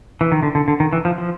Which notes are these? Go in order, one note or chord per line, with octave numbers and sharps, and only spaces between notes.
E3
D#3
D3
D3
D3
D#3
E3
F3
F3